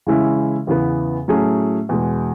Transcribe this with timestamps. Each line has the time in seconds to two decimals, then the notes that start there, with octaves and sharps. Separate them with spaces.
0.07 C#3 E3 G#3 C#4 E4
0.67 E2 C#3 E3 B3
1.28 A2 F#3 A3 C#4 G#4
1.89 E2 B2 G#3